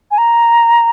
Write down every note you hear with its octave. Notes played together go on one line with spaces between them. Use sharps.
G#5
A#5